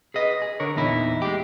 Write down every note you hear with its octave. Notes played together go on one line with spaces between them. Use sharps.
G#4 B4 D#5
G#4
D3 A#4 C#5
E2 A#2 D#4 E4
G#3 G4